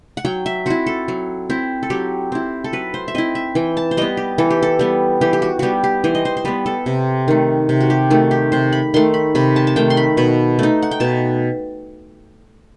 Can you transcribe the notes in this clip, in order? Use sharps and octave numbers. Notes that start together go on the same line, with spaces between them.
F#5
F#3 G5
E5
C4 E4 F#4
A4
F#3
C4 E4
A4
F#3 G4
C4 E4
A4
F#3 B4
C5
E5
C4 E4 D#5
E5
E3 G5
A5
C5
G3 B3 D#5
G4
E3 A4
G4
A4
G3 B3
E3 G4
G4
F#4
G3 B3 F#4 G4
G4
E3 C5
D#5
C5
C5
G3 B3 B4
A4
C3
D#3 A3
C3
F#4
G4
D#3 A3 F#4
G4
C3 C5
B5
D#3 A3 C6
B5
C3 B5
A5
A5
D#3 A3 G5
C6
B5
B2 B5
A3 D#4
F#5
G5
B2 A5